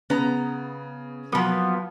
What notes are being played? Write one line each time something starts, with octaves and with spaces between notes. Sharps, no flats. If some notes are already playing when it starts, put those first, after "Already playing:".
C#3 B3 A#5
F3 F#3 A#3 B3